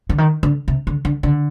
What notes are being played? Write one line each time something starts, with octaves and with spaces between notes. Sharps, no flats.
D3
D#3
D3
C3
D3
D3
D3